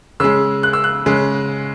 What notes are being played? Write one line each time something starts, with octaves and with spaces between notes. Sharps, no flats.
C#3 G#3 E6
F#6
E6
F#6
C#3 G#3